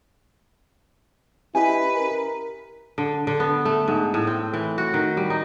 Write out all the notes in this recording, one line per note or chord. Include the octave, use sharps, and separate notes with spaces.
C#4 E4 G4 B4 D#5 G#5
A#4
D3
D3
B3
A3
G#2
A2
C4
E3
F#4
D#3
G3
D#4